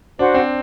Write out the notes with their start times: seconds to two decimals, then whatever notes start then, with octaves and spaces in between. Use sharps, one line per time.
0.19 D4 F#4 C5 F#5
0.34 C4